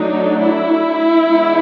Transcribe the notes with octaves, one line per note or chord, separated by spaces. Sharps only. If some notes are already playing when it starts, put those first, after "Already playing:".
Already playing: F#3 A3 D4 D#4
E4
E3 G#3 B3 D4